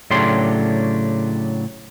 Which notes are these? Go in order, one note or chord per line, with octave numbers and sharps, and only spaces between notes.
A2 C#3 F#3 D4 G4 C6